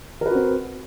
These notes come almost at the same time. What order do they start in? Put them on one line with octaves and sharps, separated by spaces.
A#4 B4 F#4 C4